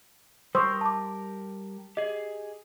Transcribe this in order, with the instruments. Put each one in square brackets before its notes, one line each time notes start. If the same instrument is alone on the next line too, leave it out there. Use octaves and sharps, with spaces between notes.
[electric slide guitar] G3 G4 A#4 [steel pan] C5 [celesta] C#6 D#6 E6
[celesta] A5 D6
[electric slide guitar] G4 G#4 [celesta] D#5